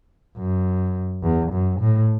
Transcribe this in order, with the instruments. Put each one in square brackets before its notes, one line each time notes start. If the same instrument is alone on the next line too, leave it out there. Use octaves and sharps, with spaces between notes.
[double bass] F#2
E2
F#2
A2